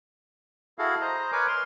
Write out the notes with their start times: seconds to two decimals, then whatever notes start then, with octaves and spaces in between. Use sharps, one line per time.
0.79 E4 F#4 G#4 A4 F5
1.01 C5 D#5 A#5
1.32 A#4 B4 C#5 G#5 D6
1.48 C6 F6